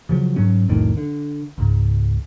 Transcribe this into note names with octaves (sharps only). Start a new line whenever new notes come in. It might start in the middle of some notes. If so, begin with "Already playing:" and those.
C#3 F3 F#3
G#2 F#3 C#4
C2 F2 A2 D#3
D3
C#2 G#2